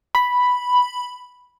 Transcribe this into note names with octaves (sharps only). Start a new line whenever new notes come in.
B5